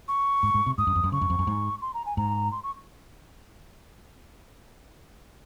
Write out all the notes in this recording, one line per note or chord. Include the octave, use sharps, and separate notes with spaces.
C#6
G#2
G#2
C3
G#2 D#6
F#2
F2
F#2
C#3 C#6
F#2
F2
F#2
G#2
C6
A#5
G#5
G#2 A#5
C6
C#6